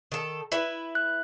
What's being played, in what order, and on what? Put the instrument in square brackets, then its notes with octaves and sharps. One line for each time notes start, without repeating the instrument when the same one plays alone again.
[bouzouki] D#3 A4
E4 B4 E5
[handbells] F#6